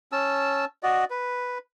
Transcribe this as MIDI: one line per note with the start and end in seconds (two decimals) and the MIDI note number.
0.12 0.65 61
0.12 0.65 81
0.12 0.65 88
0.83 1.05 66
0.83 1.05 74
0.83 1.05 75
1.10 1.58 71